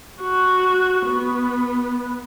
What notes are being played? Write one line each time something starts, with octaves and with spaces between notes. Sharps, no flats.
F#4
B3